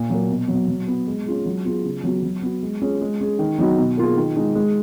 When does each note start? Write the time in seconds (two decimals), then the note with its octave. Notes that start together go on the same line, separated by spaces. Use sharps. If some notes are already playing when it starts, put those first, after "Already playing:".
Already playing: A#2
0.10 F#3 A#3
0.29 B2
0.48 F#3 B3
0.68 F#3
0.88 B3 F#4
1.07 G#3
1.26 C#4 F4 G#4
1.46 F#3
1.65 B3 F4 G#4
1.84 C#3
2.04 F#3 B3 F#4
2.23 F#3
2.42 B3 F#4
2.63 G#3
2.81 C#4 F4 G#4
3.01 G#3
3.21 C#4 G#4
3.39 D#3
3.58 F#3 B3 D#4 F#4
3.78 B2
3.98 A#3 F4 G#4
4.17 D#3
4.36 G#3 D#4
4.55 G#3